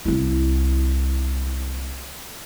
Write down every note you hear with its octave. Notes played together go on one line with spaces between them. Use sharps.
C2 E4